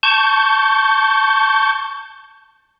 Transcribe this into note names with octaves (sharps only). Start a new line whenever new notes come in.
A5 C#6 G6